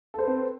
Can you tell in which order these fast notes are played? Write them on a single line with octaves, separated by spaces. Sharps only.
A4 C5 B4 C4